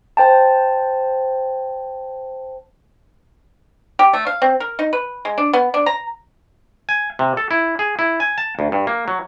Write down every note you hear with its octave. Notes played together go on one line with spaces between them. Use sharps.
C5 G5 A5
G4
A3
F5
C4
A#4
D#4
B4
G#3
D4
B3
D4
A#5
G#5
C3
A4
E4
G#4
E4
G#5
A5
D2
G2
A#3
F#3